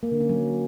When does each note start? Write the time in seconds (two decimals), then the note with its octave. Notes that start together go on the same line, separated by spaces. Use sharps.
0.03 A#3
0.12 D3
0.21 C#4
0.29 F#3